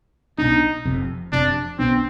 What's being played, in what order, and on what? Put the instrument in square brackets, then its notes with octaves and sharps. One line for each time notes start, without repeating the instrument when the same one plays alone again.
[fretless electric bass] B1 B2 B3 D4 [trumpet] D#4
[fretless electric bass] F1 F2 C3
[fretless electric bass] F1 F2 C3 [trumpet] D4
[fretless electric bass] B1 B2 B3 D4 [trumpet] C4